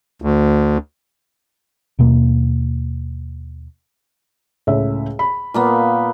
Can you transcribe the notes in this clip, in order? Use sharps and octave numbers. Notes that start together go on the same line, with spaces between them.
D2
D#2 B2 A#3
C#2 A2 E5
B5
A#2 A#3 B3